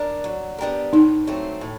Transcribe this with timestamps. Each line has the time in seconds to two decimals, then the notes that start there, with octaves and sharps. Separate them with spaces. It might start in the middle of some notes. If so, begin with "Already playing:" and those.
Already playing: D4 A#4
0.24 F#3
0.58 B3 D4 G4 A#4
0.93 A2 D#4
1.27 F#3 A3 C4
1.61 A2